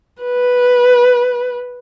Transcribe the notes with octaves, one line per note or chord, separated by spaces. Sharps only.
B4